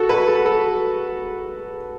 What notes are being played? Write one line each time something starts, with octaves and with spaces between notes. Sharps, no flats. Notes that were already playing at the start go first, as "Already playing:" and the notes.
Already playing: F#4 A4
B4
A4
A4